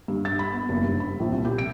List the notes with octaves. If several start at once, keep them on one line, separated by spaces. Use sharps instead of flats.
G2
A6
B5
B3
F#1
G2
B5
A#1
C2
G4
D7